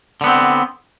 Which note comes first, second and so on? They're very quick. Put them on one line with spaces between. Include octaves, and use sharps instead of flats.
D3 B3 C4